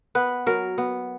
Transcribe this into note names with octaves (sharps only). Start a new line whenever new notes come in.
B3 B4
F#3 A#4
B3